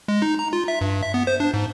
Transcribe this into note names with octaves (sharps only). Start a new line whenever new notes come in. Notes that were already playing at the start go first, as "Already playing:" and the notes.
G#3
D#4
A#5
F4
E5
G2
E5
B3
C5
D4
G#2